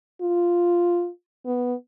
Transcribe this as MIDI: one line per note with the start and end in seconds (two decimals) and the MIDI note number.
0.21 1.09 65
1.46 1.74 59